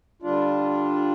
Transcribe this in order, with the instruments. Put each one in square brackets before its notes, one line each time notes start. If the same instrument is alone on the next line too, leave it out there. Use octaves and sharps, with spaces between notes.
[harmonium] D3 G3 D4 F4